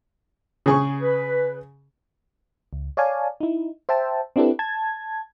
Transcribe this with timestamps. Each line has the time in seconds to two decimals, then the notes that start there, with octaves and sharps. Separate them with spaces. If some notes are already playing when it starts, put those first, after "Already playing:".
0.66 C#3 G#4 C#6
1.01 B4
2.73 C#2
2.97 C#5 D5 F5 G#5 A5
3.41 D#4 E4
3.89 C5 E5 G5 A5
4.36 C4 D4 E4 G4 A4 B4
4.59 A5 G#6